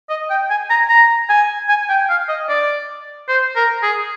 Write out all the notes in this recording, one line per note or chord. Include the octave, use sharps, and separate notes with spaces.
D#5
G5
G#5
A#5
A#5
G#5
G#5
G5
F5
D#5
D5
C5
A#4
G#4